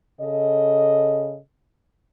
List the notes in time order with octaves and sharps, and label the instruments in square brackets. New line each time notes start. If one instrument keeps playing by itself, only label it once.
[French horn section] C#3 A4 D#5